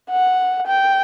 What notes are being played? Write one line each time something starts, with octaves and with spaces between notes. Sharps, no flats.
F#5
G5